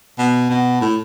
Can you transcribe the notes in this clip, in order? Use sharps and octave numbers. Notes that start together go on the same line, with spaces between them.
B2
B2
A2